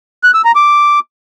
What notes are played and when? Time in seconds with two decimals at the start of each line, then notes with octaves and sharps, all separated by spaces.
0.23 F#6
0.34 E6
0.45 A#5
0.56 D6